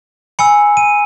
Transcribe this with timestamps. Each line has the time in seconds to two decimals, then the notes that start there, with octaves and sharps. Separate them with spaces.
0.39 G#5 B5 E6 C#7
0.77 D#7